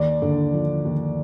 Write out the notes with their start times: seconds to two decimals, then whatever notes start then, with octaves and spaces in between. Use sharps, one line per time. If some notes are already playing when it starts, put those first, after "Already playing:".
Already playing: D#2 D5
0.22 D3
0.54 F3
0.85 D#2